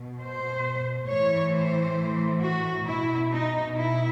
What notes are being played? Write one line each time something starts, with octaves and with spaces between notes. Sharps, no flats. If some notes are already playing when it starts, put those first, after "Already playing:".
Already playing: B2
C5
A2 E3 C#5
C5
F#4
B2 E4
D#4
E4